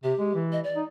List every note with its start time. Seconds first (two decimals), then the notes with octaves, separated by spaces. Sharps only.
0.04 C3 G4
0.19 G#3
0.35 E3
0.52 D#5
0.64 D5
0.76 D#4